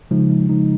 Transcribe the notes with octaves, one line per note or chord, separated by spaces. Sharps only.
C#3 F3 G#3 D#4
C#3 F3 G#3 D#4